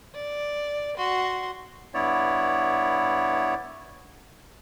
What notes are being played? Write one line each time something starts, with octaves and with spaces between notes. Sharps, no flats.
D5
F#4 C6
G2 B3 E4 C#5 D5